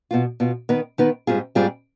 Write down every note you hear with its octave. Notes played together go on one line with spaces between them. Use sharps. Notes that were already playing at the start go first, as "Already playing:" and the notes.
B2 B3 F4
B2 B3 F4
D#3 B3 D#4 B4
D#3 B3 D#4 B4
G#2 G3 C4 F4 G#4
G#2 G3 C4 F4 G#4